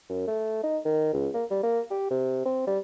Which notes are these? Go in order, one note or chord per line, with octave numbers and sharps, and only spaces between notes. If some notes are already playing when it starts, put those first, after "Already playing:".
F#2
A3
D#4
D#3
C#2
A#3
G3
A#3
G4
C3
C4
G3